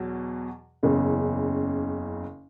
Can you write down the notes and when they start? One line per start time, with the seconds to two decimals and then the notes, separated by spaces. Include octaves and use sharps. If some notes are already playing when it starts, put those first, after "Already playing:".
Already playing: E2 B2 F#3
0.83 F#1 E2 C#3